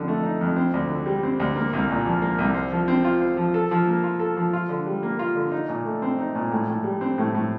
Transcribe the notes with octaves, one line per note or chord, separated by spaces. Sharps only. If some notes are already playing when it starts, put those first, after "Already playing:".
Already playing: F2 D3 D#4
A3
D#4
F2
C4
D2
D3
G3
C4
D2
A#3
C2
A#2
F3
A#3
C2
C5
F3
C4
F4
C5
F3
A4
F3
A#3
F4
A4
F3
F4
D3
G3
A#3
F4
D3
D#4
A#2
A3
C4
D#4
A#2
A2
A2
G3
C4
A2
A2